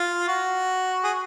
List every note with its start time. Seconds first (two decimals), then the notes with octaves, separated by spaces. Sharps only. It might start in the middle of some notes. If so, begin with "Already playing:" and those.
Already playing: F4
0.28 F#4
1.04 G#4